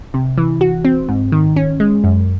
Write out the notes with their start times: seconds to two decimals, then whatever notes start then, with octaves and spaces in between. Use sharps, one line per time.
0.14 C3
0.38 E3
0.61 F#4
0.85 C4
1.09 G#2
1.32 D#3
1.56 C#4
1.80 G#3
2.04 F#2